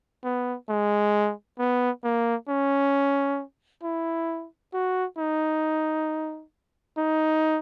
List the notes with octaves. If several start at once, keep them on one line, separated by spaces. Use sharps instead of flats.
B3
G#3
B3
A#3
C#4
E4
F#4
D#4
D#4